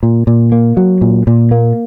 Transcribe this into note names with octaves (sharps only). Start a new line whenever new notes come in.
A#2
A#2
A#3
F#3
A#2
A#2
A#3